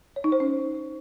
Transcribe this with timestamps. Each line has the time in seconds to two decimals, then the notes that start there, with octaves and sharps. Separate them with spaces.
0.16 C#5
0.24 D#4
0.32 C5
0.40 C#4